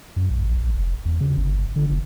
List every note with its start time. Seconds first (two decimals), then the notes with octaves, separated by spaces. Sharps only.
0.16 F#2
0.31 B1
0.44 A1
0.56 A#1
0.74 F1
1.05 E2
1.21 C#3
1.37 G1
1.76 D3
1.91 F1